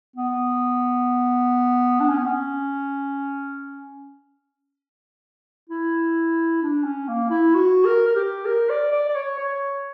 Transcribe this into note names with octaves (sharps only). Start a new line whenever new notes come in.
B3
D4
C#4
B3
C#4
E4
D4
C#4
A#3
E4
F#4
A#4
A#4
G4
A#4
D5
D5
D5
C#5
C#5